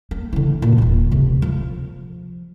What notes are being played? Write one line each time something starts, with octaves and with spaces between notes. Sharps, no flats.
A#3
D3 E3
A#2
D#1 F4
D2 C3
F3